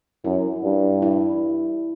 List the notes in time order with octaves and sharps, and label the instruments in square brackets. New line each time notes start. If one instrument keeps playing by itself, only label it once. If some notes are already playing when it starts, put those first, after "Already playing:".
[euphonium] F#2 [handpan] E4
[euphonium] G2
[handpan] E4